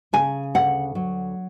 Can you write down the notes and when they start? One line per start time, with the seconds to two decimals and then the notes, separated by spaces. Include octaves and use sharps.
0.13 C#3 G#5
0.54 D2 F#5
0.95 F#3